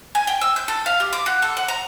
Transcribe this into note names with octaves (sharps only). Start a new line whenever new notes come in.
G#5
G5
E6
G6
A4
F5
G4
D6
F#4
A4
F#5
A#5